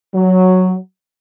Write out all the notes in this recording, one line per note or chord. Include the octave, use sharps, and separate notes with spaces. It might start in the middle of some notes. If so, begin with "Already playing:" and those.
F#3